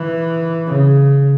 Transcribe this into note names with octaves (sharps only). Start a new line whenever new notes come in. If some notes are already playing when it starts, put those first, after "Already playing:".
Already playing: E3
C#3